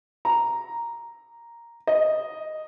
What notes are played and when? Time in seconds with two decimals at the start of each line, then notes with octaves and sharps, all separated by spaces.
0.25 A#5
1.87 D#5